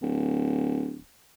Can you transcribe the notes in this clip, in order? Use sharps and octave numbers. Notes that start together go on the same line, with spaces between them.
D1